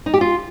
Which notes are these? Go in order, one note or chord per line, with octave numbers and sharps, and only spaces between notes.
D#4
G4
F4